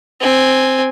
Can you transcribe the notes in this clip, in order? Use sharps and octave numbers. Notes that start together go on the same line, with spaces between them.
C4 G#5